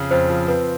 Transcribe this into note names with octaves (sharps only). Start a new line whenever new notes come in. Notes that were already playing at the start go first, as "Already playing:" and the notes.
Already playing: F2 C#3
F2 C5
F3
C4 B4